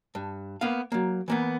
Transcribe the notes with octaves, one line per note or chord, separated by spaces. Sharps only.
G2
A#3 B3 F5
F#3 A#3
E3 A#3 B3